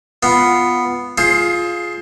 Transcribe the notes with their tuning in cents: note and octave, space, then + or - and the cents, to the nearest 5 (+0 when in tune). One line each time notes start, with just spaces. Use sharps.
B3 +0 F4 +0
F4 +0 G#4 +15 C5 +25